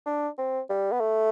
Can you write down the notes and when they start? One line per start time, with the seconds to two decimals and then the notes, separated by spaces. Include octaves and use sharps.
0.06 D4
0.38 C4
0.70 G3
0.92 B3
1.00 A3